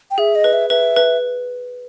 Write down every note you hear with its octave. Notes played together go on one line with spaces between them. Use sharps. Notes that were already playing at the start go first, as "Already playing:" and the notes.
G5
G#4 E5
D#5
B4
E5
B4 E5
B4